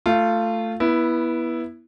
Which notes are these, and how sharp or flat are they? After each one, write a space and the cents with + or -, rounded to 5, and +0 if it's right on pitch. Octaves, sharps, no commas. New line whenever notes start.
A3 +10 F4 -15
B3 -20 E4 +0